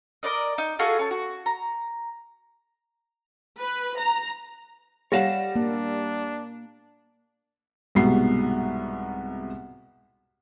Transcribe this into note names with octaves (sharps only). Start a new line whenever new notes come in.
A#4 C5 D5 D#5
D#4
F4 F#4 G#4 A4
C#4 A5
F#4
A#5
B4
A#5
G3 C#5 F5 F#5 A#6 E7
A#3 D4
C2 G#2 B2 B3 C7